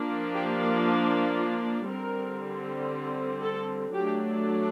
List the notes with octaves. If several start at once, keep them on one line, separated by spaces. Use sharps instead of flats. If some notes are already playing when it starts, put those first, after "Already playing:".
Already playing: F3 A#3 D4
G4
F4
F4
D3 G3 C4 A#4
A4
F#3 A3 D4 G4